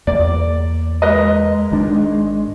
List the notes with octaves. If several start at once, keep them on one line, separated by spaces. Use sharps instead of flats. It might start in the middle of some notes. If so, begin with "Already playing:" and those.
E2 A#3 D5
G#3 A#4 B4 D#5
G#1 D#3 D4